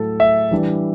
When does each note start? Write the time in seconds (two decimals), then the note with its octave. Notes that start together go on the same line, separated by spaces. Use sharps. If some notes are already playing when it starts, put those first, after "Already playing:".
Already playing: A2 F#3 A4
0.20 E5
0.51 E3 G3 D4